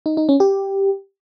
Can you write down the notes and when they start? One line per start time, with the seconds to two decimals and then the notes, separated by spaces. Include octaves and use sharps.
0.06 D#4
0.17 D#4
0.29 C#4
0.40 G4